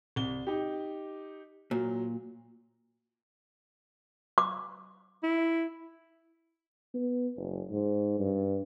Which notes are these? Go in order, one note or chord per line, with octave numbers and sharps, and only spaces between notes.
C2 G7
D#4 G4
A#2 F#3
D6
E4
B3
F#1
G#2
G2